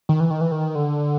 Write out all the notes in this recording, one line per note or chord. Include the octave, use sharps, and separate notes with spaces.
D#3
E3
D#3
E3
D#3
D3